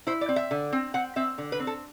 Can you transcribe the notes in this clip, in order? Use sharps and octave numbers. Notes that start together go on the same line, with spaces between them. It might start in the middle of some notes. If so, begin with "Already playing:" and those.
E4 C5
D5
C4
E5
D3
C4
C4 F#5
C4 E5
D3
B4
C4
A4